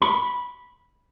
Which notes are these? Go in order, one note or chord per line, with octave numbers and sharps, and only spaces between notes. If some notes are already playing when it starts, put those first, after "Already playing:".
B5